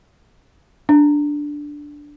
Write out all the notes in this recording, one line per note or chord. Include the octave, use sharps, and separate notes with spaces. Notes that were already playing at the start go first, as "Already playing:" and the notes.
D4